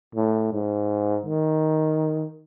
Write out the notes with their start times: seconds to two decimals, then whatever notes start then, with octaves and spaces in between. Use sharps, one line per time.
0.15 A2
0.52 G#2
1.26 D#3